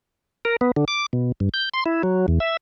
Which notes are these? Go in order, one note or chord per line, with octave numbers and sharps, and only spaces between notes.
A#4
B3
D3
D6
B2
G2
G6
C6
E4
F#3
E2
E5